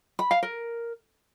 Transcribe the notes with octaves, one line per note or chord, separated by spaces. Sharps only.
B5
F5
A#4